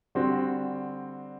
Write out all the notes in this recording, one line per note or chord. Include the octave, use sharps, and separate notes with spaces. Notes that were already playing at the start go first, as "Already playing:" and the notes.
D3 G3 C4 F#4 C5